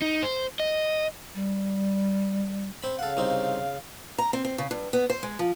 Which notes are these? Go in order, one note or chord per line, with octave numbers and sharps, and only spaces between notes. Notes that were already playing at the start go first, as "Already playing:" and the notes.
D#4
C5
D#5
G3
C4 B5
C#3 A4 F5 F#5
C2 C4 D#4
A#5
C4
C4
C#3
G2
B3
C5
G#3
F3